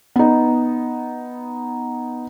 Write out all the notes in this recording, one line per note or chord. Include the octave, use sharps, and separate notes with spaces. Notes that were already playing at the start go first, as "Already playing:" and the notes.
B3 D#4